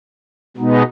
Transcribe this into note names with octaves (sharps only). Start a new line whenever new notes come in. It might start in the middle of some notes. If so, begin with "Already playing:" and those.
B2 G#3 B3 D#4